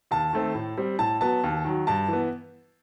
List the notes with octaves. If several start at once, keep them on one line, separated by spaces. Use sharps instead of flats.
D#2 A5
D#3 A3 C4
A2
G3 C4
A2 A5
F#3 B3 A5
D#2
D#3 F#3
G2 A5
E3 B3